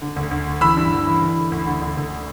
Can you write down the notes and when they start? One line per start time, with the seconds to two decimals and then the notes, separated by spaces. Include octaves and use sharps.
0.01 D3
0.16 D2
0.31 D2
0.46 D3
0.61 E3 B5 E6
0.76 G2
0.91 E3
1.07 E3
1.21 D3
1.37 D3
1.52 D2
1.66 D3
1.82 D2
1.97 D2